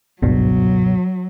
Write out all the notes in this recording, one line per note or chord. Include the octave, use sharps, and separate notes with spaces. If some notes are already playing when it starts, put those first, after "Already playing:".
G#1 C#2 G2 B2 F#3